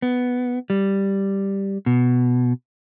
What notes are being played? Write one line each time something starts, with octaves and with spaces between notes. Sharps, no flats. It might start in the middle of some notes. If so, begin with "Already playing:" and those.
B3
G3
B2